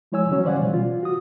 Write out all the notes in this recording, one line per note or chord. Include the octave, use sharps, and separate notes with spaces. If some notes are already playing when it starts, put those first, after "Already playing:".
F3 G#3 E4 C#5 G#5 E6
D3 E3 F#3 C#4 C#5
C5 D5 F5 F#5 G#5
B2 E3 G3
F4
F#4 D#6